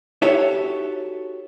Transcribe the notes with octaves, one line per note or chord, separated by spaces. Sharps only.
D#4 F#4 G4 A4 C#5 E5